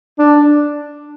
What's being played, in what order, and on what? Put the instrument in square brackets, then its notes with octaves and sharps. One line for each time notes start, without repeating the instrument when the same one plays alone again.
[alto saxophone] D4